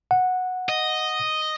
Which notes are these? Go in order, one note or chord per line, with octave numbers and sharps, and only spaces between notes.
F#5
D#5